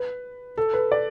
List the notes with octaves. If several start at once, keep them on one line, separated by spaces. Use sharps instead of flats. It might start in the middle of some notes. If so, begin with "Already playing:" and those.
Already playing: B4
A4
B4
D5